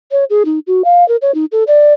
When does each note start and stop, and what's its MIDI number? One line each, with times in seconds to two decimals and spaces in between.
0.12 0.24 73
0.30 0.43 68
0.45 0.59 63
0.67 0.82 66
0.84 1.06 77
1.08 1.16 70
1.22 1.34 73
1.34 1.45 63
1.52 1.63 69
1.67 1.93 74